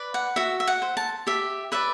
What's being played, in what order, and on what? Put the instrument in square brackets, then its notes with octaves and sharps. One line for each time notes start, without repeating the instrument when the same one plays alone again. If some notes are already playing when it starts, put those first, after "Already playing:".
Already playing: [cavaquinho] B4 D5
F#5
F#4 E5
E5
F#5
C5
A5
G4 E5
B4 D5 E5